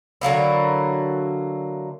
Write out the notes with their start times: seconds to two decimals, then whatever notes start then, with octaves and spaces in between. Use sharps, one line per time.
0.21 D3 F#3 A#3 E4